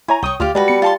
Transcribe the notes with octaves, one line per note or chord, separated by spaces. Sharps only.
E4 C#5 G#5 A#5
C2 C#5 G5 C#6 D#6
D2 F4 G4 D5 F5 F6
G3 G#3 F#4 B4 A5
B3 C#7
F4 A5 C6